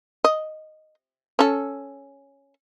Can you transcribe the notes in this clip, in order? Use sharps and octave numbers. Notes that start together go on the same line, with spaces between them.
D#5
C#4 A4